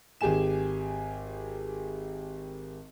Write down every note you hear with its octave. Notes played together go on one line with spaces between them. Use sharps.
G#1 G4 G#4 G#5 E7